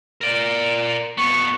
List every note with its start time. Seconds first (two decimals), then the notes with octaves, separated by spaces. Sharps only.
0.21 A#4 D5
1.18 F2 B3 C#6